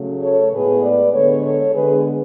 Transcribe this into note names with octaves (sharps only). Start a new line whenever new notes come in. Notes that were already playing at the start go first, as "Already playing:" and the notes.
Already playing: C#3 F#3 A3
A4 C#5
A2 G#3 B3 G#4 B4
B4 D5
D3 G#3 B3 A4 C#5
A4 C#5
D3 G#3 B3 G#4 B4